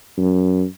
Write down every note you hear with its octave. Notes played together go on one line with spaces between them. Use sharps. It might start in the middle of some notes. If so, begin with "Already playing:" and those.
F#2